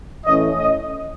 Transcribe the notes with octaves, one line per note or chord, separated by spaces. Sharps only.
A2 E3 A3 C#4 D#5
D#5